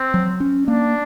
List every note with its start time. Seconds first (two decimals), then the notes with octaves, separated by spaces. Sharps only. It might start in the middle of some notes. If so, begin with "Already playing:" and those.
Already playing: C4
0.14 F#3
0.40 C#4
0.67 A#3 D4